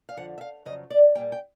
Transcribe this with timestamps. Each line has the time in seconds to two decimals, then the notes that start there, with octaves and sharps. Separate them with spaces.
0.09 F5
0.17 F2 D3 F3 F#5
0.38 E5
0.41 F5
0.65 F2 C#3 F#3 D#5
0.90 D5
1.15 A#2 G3 A#3 G5
1.32 G5